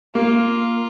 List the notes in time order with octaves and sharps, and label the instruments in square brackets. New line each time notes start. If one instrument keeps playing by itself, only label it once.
[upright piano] A#3 [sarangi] F4